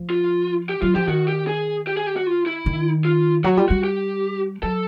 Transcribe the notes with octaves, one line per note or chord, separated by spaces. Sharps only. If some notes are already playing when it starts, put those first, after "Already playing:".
Already playing: F3
F4
G4
F#3 F4
F3 G4
D#3 F#4
G4
G#4
G4
G#4
G4
F#4
F4
E4
D#3
F4
F#3 F#4
G3 F4
G3 F#4
G4
F#3 A4